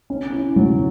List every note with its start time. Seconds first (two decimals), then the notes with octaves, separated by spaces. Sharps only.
0.10 C#4
0.33 E4
0.56 F#3